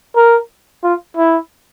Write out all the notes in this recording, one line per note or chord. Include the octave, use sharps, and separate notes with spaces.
A#4
F4
E4